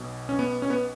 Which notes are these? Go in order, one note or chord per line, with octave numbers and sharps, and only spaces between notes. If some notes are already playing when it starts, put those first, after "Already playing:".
Already playing: B1 B2
C#4
B3
C#4
B3